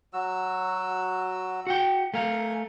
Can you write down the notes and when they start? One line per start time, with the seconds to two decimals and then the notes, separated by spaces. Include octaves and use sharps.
0.13 F#3 F#4 E6
1.67 F#4 F#5 G5
2.14 A3 A#4 F5 G#5